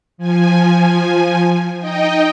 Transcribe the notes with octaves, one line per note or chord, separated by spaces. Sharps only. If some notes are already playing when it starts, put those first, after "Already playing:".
F3 G#5
D#4 D#5 G5